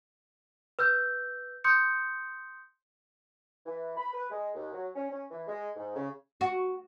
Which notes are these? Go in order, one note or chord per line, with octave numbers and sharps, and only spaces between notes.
B4 E6 G6
C6 D#6 G6 C#7
E3
B5
B4
G#3
D#2
F#3
C#4
C#4
E3
G#3
G#2
C#3
F#4